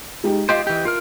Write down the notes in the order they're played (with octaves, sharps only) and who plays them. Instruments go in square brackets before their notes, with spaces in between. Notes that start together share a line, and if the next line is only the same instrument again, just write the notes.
[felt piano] G#3 D#4 G4
[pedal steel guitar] F4 G4 C5 [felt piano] D#5
[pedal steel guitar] E3 G4
F4 A#4 F6